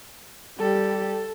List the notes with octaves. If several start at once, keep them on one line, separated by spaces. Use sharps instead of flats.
G3 G4 A4